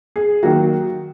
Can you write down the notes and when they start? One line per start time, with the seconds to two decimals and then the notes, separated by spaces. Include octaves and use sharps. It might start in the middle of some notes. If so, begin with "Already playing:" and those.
0.16 G#4
0.43 D#3 F#3 A#3 F#4